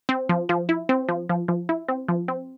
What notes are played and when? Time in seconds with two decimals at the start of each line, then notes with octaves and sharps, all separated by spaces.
0.09 C4
0.29 F3
0.49 F3
0.69 E4
0.89 C4
1.09 F3
1.29 F3
1.48 F3
1.69 E4
1.88 C4
2.08 F3
2.28 C4